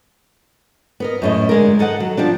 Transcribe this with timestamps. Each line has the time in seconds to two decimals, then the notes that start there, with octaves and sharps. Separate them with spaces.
1.00 B3 A#4 D#5
1.22 F#2 A2 D#5
1.49 D3 G#3 A#4
1.79 D#3 A4 D#5 F#5
2.00 F#3
2.17 F3 G3 D4